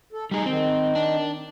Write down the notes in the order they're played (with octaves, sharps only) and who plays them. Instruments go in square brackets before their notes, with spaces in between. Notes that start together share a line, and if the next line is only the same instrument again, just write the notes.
[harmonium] A4
[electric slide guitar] G3 G#4 [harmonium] D#4
[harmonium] D#3 [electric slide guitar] C4
[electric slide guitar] D4